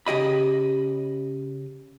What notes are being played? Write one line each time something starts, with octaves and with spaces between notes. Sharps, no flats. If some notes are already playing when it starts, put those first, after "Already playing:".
C#3 G4 D#5 B5